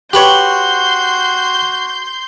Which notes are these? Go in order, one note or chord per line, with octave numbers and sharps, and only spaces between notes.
F#4 G4 B4 C#5 C6 G6